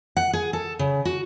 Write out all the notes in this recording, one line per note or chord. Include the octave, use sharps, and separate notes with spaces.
F#5
G#4
A4
C#3
F#4